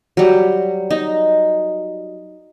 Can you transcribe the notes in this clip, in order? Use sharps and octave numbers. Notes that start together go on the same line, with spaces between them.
F#3 G3
D#4